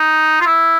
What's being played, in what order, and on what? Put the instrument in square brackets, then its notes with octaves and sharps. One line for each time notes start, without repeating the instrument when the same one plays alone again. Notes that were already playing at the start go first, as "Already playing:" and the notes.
Already playing: [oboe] D#4
F4
E4